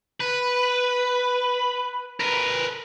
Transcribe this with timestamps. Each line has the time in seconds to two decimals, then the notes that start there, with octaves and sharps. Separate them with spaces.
0.20 B4
2.20 A#4 B4